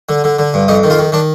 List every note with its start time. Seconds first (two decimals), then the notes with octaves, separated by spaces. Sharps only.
0.09 D3
0.24 D3
0.39 D3
0.54 G2
0.68 F2 D#4
0.83 D#3
0.90 F4
0.99 D#3
1.12 D#3 D4